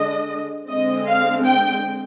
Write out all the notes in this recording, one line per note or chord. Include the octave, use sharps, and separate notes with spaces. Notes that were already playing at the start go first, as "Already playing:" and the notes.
Already playing: D3 G#3 D4 D#5
D3 G#3 C4 D#5
F5
G5